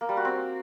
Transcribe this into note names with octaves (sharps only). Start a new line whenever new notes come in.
A#3
G3
F#4
C4